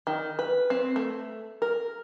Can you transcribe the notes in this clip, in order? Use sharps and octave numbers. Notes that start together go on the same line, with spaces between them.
D#3
B4
C4
A3
A#4